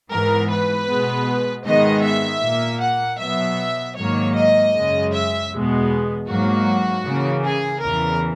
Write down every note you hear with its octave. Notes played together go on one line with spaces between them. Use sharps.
G#2 E3 B3 A#4
B4
B2 G#3 B3
G#2 D#3 G#3 B3 D#5
E5
A#2 A#3
F#5
B2 F#3 B3 E5
G#2 D#3 F#3 A#3 C#5
D#5
F#2 C#3 G#3
E5
E2 B2 G#3 B3
G#2 F#3 A#3 F#4
C#3 E3 A#3
G#4
E2 C#3 E3 A#4